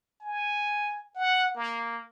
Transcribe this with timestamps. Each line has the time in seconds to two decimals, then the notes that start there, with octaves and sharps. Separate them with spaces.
0.21 G#5
1.16 F#5
1.55 A#3